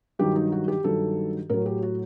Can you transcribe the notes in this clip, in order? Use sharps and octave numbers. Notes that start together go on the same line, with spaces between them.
G2 D#3 F#3 G4
D#4
F#4
G4
G2 D#3 F#3 A4
A2 F#3 A#4
G4
F#4